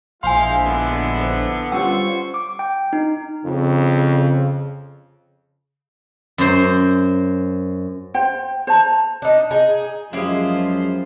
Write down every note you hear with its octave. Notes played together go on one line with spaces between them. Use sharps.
A#1 G#3 E4 C5 F5 G#5 C6
D3 B3
C5
G3 C#4 F4 C5 C#5 F#5 C#6 E6
D6
G5
D#4
F2 C#3
F#2 C5
C5 G5
C5 A5 A#5
D4 D#4
D#4 G#4
F#2 F3 G#3 E4 G4 C5 D#5 F5